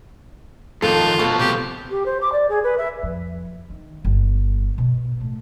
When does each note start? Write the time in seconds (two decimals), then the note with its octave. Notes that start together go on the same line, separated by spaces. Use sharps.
0.82 F2 D#3 F4 A4
1.19 B2 F3 A4
1.39 C3 G4
1.90 G4
2.05 C5
2.21 D6
2.32 D5
2.49 G#4
2.63 B4
2.77 E5
3.03 F2
3.70 D#3
4.05 G1
4.78 B2
5.21 A2